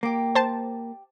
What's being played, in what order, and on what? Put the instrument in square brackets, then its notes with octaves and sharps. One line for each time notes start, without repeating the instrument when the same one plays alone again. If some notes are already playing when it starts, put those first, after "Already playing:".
[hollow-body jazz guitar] A#3 [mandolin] G4 D6
[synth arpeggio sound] C5 A5